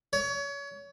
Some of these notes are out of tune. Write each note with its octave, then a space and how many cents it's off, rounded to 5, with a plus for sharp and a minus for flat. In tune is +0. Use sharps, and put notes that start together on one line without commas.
C#5 +30